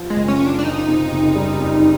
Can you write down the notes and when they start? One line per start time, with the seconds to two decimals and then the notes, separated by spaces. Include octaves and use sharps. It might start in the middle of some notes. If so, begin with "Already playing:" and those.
Already playing: F3
0.10 G#3
0.16 F#1
0.28 C#4
0.40 F3
0.46 D4
0.59 D4
0.63 F3 D#4
0.88 C3
1.12 F#1
1.36 G3
1.59 F2